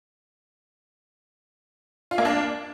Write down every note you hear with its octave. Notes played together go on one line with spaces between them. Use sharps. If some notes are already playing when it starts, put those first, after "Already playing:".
F4
A#3
D4